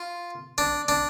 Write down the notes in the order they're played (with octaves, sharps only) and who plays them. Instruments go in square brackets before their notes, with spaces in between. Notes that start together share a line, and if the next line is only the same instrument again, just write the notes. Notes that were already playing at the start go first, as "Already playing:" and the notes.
Already playing: [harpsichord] F4
D4
D4